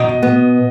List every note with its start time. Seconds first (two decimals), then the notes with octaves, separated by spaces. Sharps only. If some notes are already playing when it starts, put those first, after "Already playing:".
Already playing: B2 D#5
0.23 B3